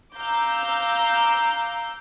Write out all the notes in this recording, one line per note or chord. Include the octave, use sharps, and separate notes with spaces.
F5 A#5 D6 E6 G6